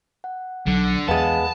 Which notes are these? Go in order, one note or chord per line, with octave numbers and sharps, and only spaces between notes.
F#5
B1 D3 F#3
E2 G#3 B3 F5 F#5 A5 B5